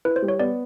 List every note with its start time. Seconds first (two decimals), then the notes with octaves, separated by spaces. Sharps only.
0.05 E4 B4
0.16 C5
0.22 G3
0.28 C#5
0.40 B3 D5